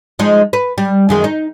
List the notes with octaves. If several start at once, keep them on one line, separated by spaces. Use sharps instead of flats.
F3 G#3 D#4
B4
G3
F#2 D#3 G#3
D#4